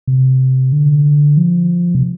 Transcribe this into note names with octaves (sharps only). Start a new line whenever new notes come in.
C3
D3
F3
C3